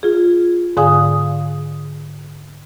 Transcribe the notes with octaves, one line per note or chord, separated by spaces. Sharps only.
F4 G#4
G#2 D3 G#4 F5 G#5 D#6